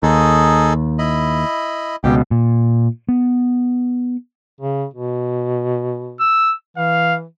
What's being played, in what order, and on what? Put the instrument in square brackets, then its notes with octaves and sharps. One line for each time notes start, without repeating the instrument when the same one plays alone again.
[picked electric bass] D#2 [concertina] D#4 G#4 A4
[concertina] E4 D#5 B5
[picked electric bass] C#2 B2 [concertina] G4 G5
[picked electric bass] A#2
B3
[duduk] C#3
B2
[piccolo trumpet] E6
[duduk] E3 [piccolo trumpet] F5